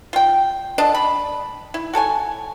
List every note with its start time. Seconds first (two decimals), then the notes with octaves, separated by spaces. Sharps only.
0.13 F4 G5
0.78 D3 D4 D#5 A5
0.95 B5
1.74 E4
1.93 F#4 A4 C#5 G#5